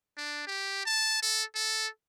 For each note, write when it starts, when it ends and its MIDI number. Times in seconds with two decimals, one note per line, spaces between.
0.17 0.47 62
0.47 0.85 67
0.86 1.22 81
1.22 1.43 69
1.55 1.87 69